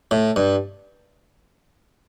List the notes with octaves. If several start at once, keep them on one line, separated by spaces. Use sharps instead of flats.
A2
G2